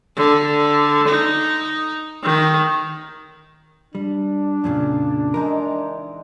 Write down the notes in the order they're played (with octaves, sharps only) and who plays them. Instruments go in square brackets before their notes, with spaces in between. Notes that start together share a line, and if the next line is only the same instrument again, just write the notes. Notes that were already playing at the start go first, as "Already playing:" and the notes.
[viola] D3
D#4
D#3
[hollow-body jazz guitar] G3 [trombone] D4
[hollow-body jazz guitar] F2 A#2 C#3
[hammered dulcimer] E3 G#3 D#4 [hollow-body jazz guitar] A#4